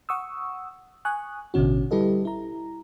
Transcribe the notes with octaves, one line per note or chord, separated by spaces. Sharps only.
F#5 C#6 D#6 E6
G#5 C#6 D#6 F#6
A1 B2 D3 C#4 F#4
G3 E4 G4 A4 B4 D#5
E4 A#5